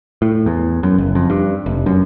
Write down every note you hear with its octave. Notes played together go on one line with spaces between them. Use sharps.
A2
E2
F#2
F#1
F2
G2
F1
F#2